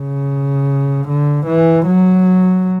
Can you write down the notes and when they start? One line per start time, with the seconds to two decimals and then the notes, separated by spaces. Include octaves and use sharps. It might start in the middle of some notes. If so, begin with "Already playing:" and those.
Already playing: C#3
1.08 D3
1.47 E3
1.87 F#3